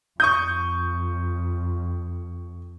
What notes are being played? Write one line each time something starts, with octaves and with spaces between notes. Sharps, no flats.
F2 C#6 D#6 G6